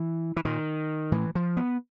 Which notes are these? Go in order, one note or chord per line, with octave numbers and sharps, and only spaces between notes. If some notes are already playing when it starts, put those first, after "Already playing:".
Already playing: E3
E3
A#2 D#3
A2 E3
F3
B3